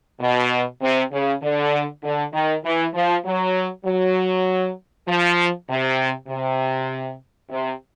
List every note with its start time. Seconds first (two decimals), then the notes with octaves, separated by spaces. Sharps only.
0.21 B2
0.82 C3
1.12 C#3
1.43 D3
2.03 D3
2.34 D#3
2.65 E3
2.95 F3
3.25 F#3
3.85 F#3
5.07 F3
5.68 C3
6.28 C3
7.50 C3